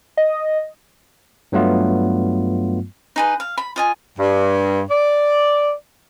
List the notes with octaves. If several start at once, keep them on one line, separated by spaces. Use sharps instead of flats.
D#5
G2 F#3 A3 B3 F4
D#4 G#4 B4
F5
B5
F4 D#5 G#5
G2
D5